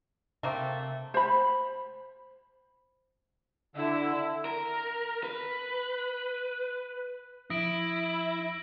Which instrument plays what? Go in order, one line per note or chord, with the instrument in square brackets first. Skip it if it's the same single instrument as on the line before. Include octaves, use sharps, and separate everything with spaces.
[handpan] C3 E5 [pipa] A3 A#3 C4
[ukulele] C5 B5
[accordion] D3 [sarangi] E4
[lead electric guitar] A#4
B4
[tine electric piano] F3 D#6 [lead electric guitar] E4 [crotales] A#6 D7 F#7